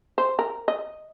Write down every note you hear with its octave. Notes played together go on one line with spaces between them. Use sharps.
C5
A#4
D#5